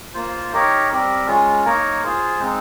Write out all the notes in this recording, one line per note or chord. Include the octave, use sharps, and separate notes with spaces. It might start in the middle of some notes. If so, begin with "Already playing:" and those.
A#3 F4 C5
D#4 G4 A#4 C#5
G3 C4 G4 A#4
G#3 C#4 F4
A#3 D#4 A#4 C#5
F4 G#4 C5
G#3 C4 D#4